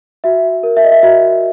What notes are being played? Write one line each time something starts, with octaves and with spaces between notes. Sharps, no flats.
F#4 E5
A#4
E5
D#5
E5
F#4 E5